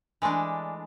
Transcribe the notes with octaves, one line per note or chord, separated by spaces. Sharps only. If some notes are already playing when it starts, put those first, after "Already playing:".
E3 G#3 A3 D4